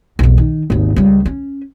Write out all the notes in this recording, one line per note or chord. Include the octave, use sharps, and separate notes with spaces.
B1 E2
D#3
G#1 D#2
C#2 G3
C#4